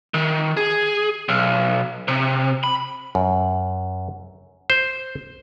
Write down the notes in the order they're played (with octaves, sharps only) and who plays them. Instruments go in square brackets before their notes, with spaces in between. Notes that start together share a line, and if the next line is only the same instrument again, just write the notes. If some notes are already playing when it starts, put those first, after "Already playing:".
[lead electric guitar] D#3
G#4
B1
C3
B5
[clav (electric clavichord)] F#2
C5